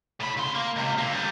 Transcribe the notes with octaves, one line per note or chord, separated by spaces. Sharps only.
A2 B5
C#3 C6
A#3
C#2 C3
D3 A#3
G3 B3